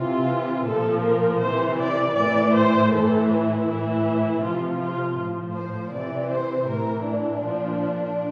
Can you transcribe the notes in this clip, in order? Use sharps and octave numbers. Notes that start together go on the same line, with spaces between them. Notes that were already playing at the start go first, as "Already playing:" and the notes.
Already playing: C3 E3 F4
A#2 A4
F3
A#4
C3 E3 C5
D5
A2 E3 D5
C5
A2 E3 A4
E4
A2 E3
C3 F3 F4
F4
A2 F3
C5
C3 E3 D5
C5
A2 E3 A#4
D4
A#2 F3